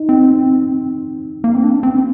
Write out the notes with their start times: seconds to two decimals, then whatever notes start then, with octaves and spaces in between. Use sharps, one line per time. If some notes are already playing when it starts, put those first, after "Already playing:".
Already playing: D#4
0.09 C4
1.44 A#3
1.54 C4
1.64 D4
1.83 C4